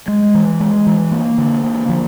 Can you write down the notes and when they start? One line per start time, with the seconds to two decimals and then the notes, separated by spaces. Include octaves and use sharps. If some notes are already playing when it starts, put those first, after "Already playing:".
0.08 G#3
0.34 E3
0.60 G#3
0.87 E3
1.12 A#3
1.38 D3
1.64 A#3
1.89 F3